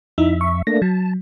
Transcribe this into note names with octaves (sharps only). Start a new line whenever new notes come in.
F2 D#4 E4 E5
C#6
A3 A#3 D4 A#6
F#3 A5